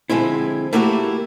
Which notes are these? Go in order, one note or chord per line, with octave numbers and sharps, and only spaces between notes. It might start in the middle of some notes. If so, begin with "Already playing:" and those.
D3 F3 G#3 C4 E4
A3 A#3 D#4 E4 F#4 G4